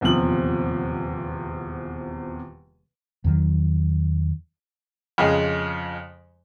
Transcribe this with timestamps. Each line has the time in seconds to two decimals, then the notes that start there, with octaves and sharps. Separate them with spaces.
0.01 D#1 E2 C3 F3 F#7
3.24 E2 D#3 F#3
5.18 F2 C#3 G#3